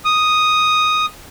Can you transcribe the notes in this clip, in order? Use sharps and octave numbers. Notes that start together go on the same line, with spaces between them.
D#6